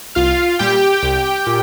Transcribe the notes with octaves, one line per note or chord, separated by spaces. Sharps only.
C2 F4 F5
A#2 G3 G4 G5
C2
A#2